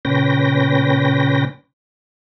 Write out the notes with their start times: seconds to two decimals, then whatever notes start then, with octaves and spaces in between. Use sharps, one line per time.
0.05 A#2 C#3 C#4 B4 G5 A#6